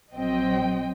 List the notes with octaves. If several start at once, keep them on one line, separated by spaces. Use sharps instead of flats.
A#1 F#3 C4 D#5 G5